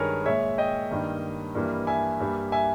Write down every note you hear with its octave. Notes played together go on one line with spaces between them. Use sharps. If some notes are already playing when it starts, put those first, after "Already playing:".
Already playing: G2 D#3 G#3 G#4 A#4 B4 C#5
A#2 G#3 C#5 E5
D#5 G5
G2 D#3 A#3
G2 E3 G3 A#3
E5 G#5
G2 G3 A#3
E5 G#5